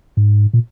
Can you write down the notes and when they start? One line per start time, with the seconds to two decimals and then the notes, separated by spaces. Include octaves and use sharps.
0.17 G#2
0.53 A#2